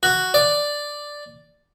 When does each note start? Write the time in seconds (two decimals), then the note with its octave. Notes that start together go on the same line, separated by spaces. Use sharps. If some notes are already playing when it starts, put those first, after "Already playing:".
0.03 F#4
0.34 D5